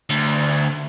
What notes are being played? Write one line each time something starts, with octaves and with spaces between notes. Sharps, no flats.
D2